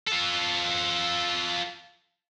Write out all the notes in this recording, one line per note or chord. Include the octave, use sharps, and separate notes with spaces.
F4 A4